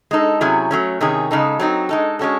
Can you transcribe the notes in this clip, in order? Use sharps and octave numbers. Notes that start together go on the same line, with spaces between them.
G#3 D#4 A4
C3 F#3 C#4 E4 G#4
F#3 A3 C#4
C3 D#3 C#4 G#4
C#3 G#3 D#4 A4
F#3 C4 D#4
G#3 D#4 A4
G#3 C#4 F#4 A4